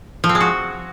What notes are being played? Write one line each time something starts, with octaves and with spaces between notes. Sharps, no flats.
F3
C4
G#3
F#4